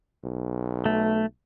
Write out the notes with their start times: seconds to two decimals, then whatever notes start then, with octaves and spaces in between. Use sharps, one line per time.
0.24 B1
0.86 A3